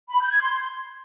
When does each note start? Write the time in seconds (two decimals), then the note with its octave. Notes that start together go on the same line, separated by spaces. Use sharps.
0.11 B5
0.21 G6
0.31 G#6
0.40 C6